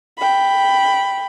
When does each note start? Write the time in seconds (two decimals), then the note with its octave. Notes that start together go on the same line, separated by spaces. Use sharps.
0.18 G5 B5